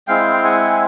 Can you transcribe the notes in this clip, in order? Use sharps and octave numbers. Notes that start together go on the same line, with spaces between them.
G#3 C4 E4 F5 G5
G5
F#5 G#5
G#5